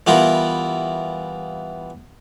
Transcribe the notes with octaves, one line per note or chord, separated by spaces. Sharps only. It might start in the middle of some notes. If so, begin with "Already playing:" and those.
E3 G3 B3 E4 F4 A#4